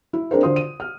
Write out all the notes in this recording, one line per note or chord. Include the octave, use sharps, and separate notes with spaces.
E4
C4 D4 G#4 A#4 C5
D3 F4 C5 C6 D#6
D#7
F6